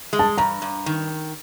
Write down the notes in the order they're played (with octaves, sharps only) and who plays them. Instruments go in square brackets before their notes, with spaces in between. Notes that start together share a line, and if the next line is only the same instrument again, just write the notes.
[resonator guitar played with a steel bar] G#3
[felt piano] A5
[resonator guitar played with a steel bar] G2 [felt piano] A#5
[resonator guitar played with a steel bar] G2
D#3